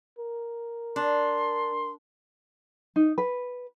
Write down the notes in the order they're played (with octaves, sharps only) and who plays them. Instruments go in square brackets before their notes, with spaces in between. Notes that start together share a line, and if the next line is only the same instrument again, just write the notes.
[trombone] A#4
[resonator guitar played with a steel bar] D4 [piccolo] C6
[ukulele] D#4
B4